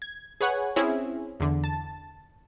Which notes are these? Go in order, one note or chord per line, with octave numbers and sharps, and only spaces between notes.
G#6
G#4 B4 C#5 F#5 G#5
C4 C#4 E4 G#4
E2 D3
A5